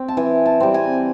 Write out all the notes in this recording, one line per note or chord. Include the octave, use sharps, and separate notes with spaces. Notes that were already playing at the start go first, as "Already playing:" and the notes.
Already playing: C4
A5
E3 G#5
A5
G3 C4
G#5